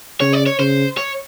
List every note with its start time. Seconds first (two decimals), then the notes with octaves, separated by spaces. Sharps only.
0.20 C#3 C#5
0.33 D5
0.46 C#5
0.59 C#3 C5
0.97 C#5